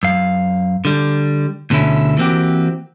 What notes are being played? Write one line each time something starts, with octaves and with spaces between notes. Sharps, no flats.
F#2 F5
D3 G3
D2 B2 D3 C#4 E4
E3 A#3 C4 F#4 G4